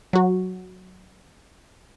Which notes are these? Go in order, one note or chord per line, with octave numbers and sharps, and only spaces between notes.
F#3 F#4